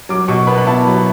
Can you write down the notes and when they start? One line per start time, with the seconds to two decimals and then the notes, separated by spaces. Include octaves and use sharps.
0.09 F#3 D6
0.28 B2 C#6
0.47 B3 B5
0.58 B5
0.67 E4 A5
0.86 F#3